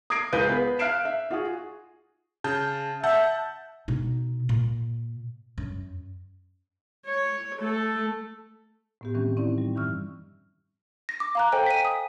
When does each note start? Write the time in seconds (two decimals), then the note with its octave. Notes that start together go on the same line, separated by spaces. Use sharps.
0.10 D#6 G#6 A#6 C7 D7
0.33 C#2 G#4 A#4 B4 G6 D#7
0.48 B3 G#4 B4
0.79 F5 F6 F#6 C7 D7 E7
1.05 E5
1.31 F4 F#4 G#4
2.44 C#3 A5 G6
3.04 E5 F#5 A5 G6
3.88 B2 D#4
4.49 A#2
5.58 F#2
7.06 C#5
7.60 A3 A4
9.01 A2 B3 G4
9.14 D#3 E3 G3 C4 C#4
9.37 C4 C#4 D#4 E4 D5
9.58 G3
9.75 G2 D#3 E3 C#6 E6 F6
11.09 A#6
11.20 D6
11.35 F5 A#5 F#6
11.52 A4 C5 D#5 G5 G#5
11.66 B6 D#7
11.85 D#6